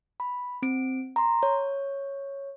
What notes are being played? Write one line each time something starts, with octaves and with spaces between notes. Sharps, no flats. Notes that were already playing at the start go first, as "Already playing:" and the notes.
B5
C4 D7
A#5 C6
C#5